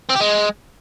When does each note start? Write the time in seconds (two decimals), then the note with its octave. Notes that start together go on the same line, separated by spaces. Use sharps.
0.10 C4
0.15 G4
0.21 G#3